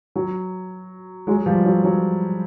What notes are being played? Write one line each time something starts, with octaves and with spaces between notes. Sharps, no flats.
F#3
F#3 G#3
F3 G3
F#3
F#3